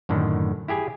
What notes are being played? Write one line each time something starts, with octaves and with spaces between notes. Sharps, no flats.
F#2 A2 D3 D#3
E4 G4 G#4 G#5